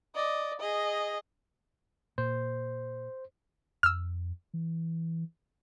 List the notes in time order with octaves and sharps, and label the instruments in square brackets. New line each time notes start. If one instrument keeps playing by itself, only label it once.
[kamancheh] D5 D#5
G#4 D#5
[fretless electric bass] A#2 [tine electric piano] C5
[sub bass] F2 [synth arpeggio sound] E6 F6
[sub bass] E3